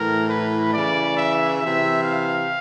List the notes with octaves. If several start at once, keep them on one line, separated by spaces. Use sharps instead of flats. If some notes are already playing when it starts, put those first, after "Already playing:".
Already playing: A2 E3 A#4
B4
C#3 E3 D5
E5
C3 E3 E5
F5